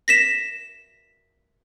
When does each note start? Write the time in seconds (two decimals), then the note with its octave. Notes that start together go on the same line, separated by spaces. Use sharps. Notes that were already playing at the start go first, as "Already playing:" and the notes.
0.08 A#6 B6 E7